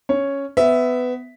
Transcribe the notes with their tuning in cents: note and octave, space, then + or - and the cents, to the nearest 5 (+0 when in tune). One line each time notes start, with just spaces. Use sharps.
C#4 +0 C#5 +0
B3 +20 E5 +0